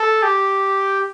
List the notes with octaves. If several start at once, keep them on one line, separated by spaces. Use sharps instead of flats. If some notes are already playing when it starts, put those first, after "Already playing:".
Already playing: A4
G4